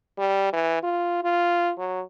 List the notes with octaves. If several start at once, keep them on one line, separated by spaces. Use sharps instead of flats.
G3
E3
F4
F4
F#3